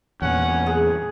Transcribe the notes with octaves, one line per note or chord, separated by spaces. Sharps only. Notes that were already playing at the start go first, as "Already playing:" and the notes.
E2 A#2 C#4 F#5
G#4